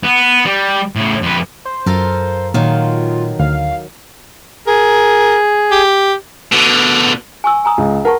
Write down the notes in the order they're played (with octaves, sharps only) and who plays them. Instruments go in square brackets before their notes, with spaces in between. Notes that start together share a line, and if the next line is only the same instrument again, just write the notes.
[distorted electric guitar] B3
G3
A2 C#3
F2 B4
[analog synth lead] C5
[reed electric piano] F#2 [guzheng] F4 A4 A#4
[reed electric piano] A#2 [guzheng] D#3 F#3 [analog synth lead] F4
[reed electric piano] D2 [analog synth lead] F5
[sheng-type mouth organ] G#4 [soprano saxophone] A#4
[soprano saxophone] G4
[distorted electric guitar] B2 D3
[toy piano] G#5 C#6 E6
G#5 A#5 D#6
[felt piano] C#2
[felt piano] A#4 [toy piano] F#5 A5 C#6